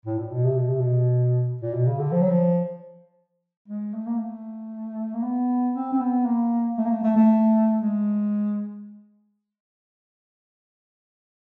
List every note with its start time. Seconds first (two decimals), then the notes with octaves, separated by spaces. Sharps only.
0.05 A2
0.18 A#2
0.31 B2
0.45 C3
0.57 B2
0.69 C3
0.80 B2
1.61 A#2
1.74 B2
1.87 C#3
1.99 D3
2.12 F3
2.21 F#3
2.29 F3
3.68 G#3
3.94 A3
4.06 A#3
4.17 A3
5.14 A#3
5.23 B3
5.74 C4
5.92 C4
6.01 B3
6.25 A#3
6.78 A3
6.85 A#3
6.90 A3
7.03 A3
7.16 A3
7.81 G#3